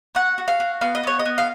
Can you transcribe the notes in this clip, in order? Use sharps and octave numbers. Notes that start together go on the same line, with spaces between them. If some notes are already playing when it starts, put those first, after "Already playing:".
F#4 F#5
F#4
F5
F#4
B3 F5
D#5
B3 C#5
D#5
B3
F5